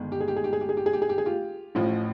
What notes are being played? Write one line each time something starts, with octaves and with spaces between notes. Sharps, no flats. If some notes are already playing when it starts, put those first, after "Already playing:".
Already playing: G1 D#3 G#3
G4
G#4
G4
G#4
G4
G#4
G4
G#4
G4
G#4
G4
G#4
G4
G#4
F4 G4
A1 A2 F3